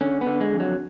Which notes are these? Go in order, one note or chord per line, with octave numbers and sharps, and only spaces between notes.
D3 C#4
B3
D3
G#3
F2
F#3